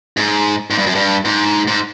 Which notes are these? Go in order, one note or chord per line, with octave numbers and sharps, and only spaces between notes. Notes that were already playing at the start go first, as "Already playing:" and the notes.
G#2
G#2
G2
F#2
G2
G#2
G#2